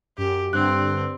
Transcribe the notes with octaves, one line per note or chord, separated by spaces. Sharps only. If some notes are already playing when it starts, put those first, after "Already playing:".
F#2 G4
G2 D3 C4 F#6